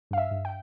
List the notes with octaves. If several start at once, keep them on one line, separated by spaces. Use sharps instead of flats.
G2 F5
E5
G2
G5